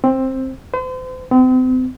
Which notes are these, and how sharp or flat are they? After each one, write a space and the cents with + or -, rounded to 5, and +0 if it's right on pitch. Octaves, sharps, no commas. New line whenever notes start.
C4 +10
C5 -40
C4 -40